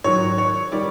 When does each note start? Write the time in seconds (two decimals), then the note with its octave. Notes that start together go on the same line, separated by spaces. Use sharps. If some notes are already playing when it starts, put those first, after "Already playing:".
0.04 G#2 D#3 F#3 C#5
0.38 C#5
0.72 D#3 G3 D5